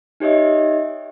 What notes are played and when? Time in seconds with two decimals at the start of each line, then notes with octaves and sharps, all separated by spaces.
0.20 D#4 G4 C#5 D#5 E5